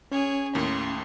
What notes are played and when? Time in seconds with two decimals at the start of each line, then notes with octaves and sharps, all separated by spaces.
0.12 C#4 G#4 C#5
0.55 D#2 A2 A#3 C6 C#6